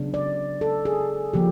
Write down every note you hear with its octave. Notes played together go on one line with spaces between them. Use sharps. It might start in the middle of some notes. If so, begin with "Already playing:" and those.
Already playing: C#3 F#3 B3 D4
D5
A4
G#4
C#3 F3 A#3 G4